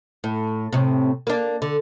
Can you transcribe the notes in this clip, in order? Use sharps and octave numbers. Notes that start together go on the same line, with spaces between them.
A2
A2 C3
A#3 D4
D3